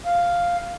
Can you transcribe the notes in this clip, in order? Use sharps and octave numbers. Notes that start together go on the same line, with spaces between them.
F5